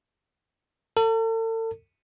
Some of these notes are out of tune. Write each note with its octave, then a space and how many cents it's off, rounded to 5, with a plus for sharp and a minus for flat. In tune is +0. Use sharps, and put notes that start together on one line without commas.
A4 +40